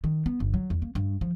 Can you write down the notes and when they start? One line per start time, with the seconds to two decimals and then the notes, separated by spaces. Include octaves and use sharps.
0.04 D#3
0.26 B3
0.40 G1
0.54 F#3
0.70 E2
0.82 A#3
0.95 G2
1.21 F3